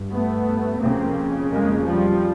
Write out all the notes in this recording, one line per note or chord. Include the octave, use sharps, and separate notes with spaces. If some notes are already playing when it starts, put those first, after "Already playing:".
Already playing: G2
A3 B3
F2 C#3 A#3 C4
G#3 A#3
F3 G3